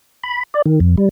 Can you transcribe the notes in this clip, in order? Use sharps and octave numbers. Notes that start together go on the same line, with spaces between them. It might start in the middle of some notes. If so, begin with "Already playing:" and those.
B5
D5
D#3
F2
G3